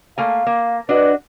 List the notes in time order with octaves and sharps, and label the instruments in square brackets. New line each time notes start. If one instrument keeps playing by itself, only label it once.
[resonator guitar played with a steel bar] A3 A#3 G#5 [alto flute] F5
[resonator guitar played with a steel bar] A#3
[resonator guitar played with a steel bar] D4 F#4 D#5 [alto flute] B4